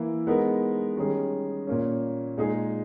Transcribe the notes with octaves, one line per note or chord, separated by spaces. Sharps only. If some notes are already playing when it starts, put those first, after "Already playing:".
Already playing: E3 A#3 E4
G#3 B3 D#4 A#4
D#3 G3 C#4 G#4
A#2 A#3 C#4
A#2 G#3 D#4 G#4